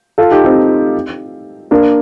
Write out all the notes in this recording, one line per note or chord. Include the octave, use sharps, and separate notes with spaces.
F4 A4
D#4 G4
C4 D#4
A#3 D4